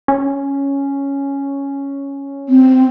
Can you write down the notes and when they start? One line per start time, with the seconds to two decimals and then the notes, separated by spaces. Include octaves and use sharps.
0.08 C#4
2.49 C4